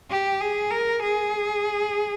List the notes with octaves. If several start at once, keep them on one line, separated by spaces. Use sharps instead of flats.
G4
G#4
A#4
G#4